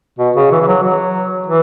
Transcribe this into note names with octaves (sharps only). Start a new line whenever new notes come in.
B2
C#3
E3
E3
F#3
F#3
E3